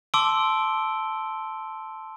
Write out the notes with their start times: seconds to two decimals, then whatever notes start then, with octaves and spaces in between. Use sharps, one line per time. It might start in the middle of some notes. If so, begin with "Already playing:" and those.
0.14 A5 C6 D6 E6 D7 G7